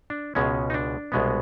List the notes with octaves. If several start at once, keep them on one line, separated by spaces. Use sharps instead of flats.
D4
C#2 B2 G#3 C#4
D#4
D4
C2 B2 G#3 B3